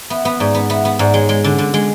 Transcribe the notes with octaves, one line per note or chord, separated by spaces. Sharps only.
B3 E5
B3
G#2 D5
B3
B3 E5
B3 F#5
G#2 D5
G#3 C#5
G#3
D3
D3
G#3